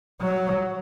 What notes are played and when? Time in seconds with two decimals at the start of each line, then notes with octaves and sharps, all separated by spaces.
0.21 F#3